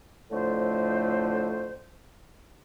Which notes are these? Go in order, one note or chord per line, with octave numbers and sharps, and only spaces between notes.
F2 A2 D3 A3 C5